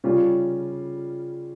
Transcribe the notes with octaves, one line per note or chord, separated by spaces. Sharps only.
C#3 G3 C#4 F4